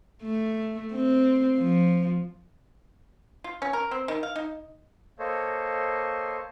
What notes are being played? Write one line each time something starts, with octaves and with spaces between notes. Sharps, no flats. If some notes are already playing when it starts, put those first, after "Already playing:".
A3
C4
F3
F4
C#4
A#4
C4
D#3
F5
D#4
A#3 A4 C5 C#5 D#5